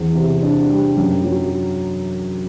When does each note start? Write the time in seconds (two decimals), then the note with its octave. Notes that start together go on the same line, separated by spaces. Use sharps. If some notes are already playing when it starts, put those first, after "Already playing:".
Already playing: E2 C4
0.15 C3
0.42 D4
0.70 G3
0.97 F#2
1.24 F#3